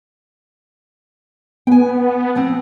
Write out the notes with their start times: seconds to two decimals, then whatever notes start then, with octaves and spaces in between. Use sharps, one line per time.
1.67 B3 G5 G#5
2.35 F3 B3 C4